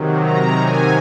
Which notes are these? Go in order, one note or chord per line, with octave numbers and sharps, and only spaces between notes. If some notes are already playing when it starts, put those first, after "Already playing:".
Already playing: C3 D#3 F#3
A#5
G#5